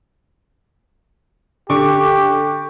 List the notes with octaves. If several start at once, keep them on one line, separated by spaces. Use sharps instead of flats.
D3 G4 C#6 D6